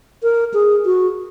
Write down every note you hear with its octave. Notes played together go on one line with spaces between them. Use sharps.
A#4
G#4
F#4